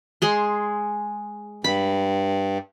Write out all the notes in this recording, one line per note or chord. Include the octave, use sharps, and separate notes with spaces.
G#3 G#4 C6
G2 B5